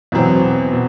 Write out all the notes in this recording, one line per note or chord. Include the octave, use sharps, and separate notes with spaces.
E2 B2 F#3 C4
B2